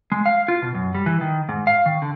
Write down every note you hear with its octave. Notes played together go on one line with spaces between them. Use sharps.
G#3
F5
F4
B2
F#2
G3
E3
D#3
G#2
F5
D#3
D3